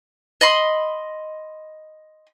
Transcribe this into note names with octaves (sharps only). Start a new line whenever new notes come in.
D#5 B5 C6